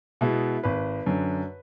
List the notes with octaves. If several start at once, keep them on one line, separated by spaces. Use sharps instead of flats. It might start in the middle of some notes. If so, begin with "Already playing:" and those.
B2 G#3 B3 E4
G#1 B4
F#2 D3